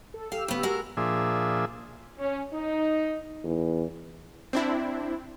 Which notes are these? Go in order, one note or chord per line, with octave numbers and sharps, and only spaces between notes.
A4
G4 F5 E6
C#3 B3
G#3 F#4 A#4
A#2 F3 D4 G#4 E5
C#4
D#4
E2
C4 D4 E4